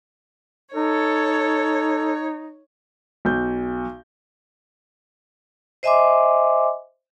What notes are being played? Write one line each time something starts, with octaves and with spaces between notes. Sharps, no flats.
D#4 A4 C#5
B1 G6
C5 D#5 E5 G#5 C6 D6